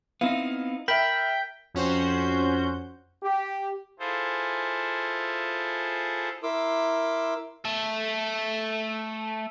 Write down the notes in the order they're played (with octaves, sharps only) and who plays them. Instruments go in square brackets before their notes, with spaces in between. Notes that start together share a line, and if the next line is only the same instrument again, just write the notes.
[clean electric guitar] B3 C4 D#4 [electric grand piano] E4 F5
[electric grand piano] A#4 E5 [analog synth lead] G5 [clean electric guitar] B5 [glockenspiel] G6 B6
[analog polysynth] F2 C#4 F#4 C5 G6
[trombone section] G4
[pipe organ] E4 F4 G#4 A4 C5
[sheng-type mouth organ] E4 A#4 C6 D6 E6
[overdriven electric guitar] A3 A4